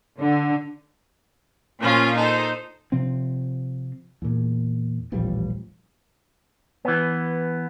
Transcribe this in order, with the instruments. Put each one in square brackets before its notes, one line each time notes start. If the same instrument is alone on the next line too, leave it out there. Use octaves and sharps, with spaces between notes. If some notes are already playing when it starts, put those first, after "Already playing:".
[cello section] D3
[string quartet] A#2 F3 C#4 F4
D#4 A4 C5
[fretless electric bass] C3 F3 C4
E2 A#2
D#1 A1 F3 G3
[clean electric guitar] E3 B3